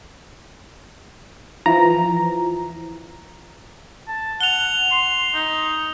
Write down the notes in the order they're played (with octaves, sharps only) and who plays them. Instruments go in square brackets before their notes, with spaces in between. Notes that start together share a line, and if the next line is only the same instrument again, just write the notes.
[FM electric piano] E3 F3 [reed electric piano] A#5
[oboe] A5
[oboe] F#5 [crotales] F7 G7
[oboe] C6
D#4